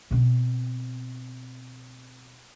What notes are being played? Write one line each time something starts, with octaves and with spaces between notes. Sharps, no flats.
B2 C4